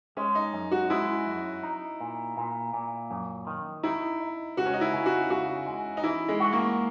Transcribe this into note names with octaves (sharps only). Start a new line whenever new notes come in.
G#3 C#4
D#4
F#2
F#4
G#3 E4
F#2
D#4
A#2
A#2
A#2
F#2
D#3
D#4 E4
D#4
C#2 F#4
C#4
D#4
E4
C#3
F#4
C#3 F#4
G#3
D#4
E3 E4
G#3
F#4
A#3